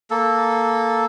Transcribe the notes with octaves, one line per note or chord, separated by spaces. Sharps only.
A#3 A4